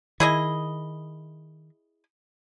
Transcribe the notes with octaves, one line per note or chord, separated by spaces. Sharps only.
D#3 E4 G#4 D#5